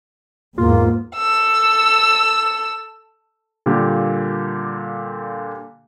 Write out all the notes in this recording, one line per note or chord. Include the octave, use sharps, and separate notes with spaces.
E2 G#2 A#3 F4
A4 E6
A#2 D3 G3 A#3 G4